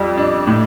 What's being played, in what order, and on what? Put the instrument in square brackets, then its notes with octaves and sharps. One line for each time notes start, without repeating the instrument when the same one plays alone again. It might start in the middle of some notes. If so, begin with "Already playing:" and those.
Already playing: [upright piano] F2 G3
D4
A2